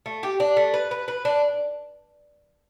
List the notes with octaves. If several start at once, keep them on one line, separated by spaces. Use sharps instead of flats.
A3
G4
D4
A3
B4
B4
B4
D4